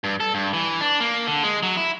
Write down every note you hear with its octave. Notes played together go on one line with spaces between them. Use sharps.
G2
A4
G2
E3
D4
A#3
D3
G#3
F#3
E4